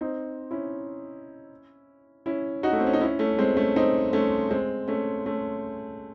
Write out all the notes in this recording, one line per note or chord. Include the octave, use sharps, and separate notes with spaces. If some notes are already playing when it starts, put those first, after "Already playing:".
C4 D#4
C#4 E4
C#4 E4
D#4 F#4
A3
C4
C#4
D#4
C#4 E4
A3 C#4
G#3 C4
A3 C#4
C4 D#4
A3 C#4
G#3 C4
A3 C#4
A3 C#4